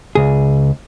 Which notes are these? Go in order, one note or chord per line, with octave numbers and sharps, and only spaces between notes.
C#2 G#4